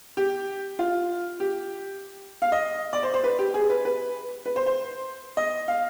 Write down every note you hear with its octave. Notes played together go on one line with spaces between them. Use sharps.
G4
F4
G4
F5
D#5
D5
C5
C5
B4
G4
G#4
B4
B4
B4
C5
C5
D#5
F5